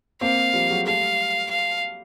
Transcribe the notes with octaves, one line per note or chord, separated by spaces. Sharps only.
A#3 C4 F5
F3 G3
F#3 G#3
G3 A3 F5
F5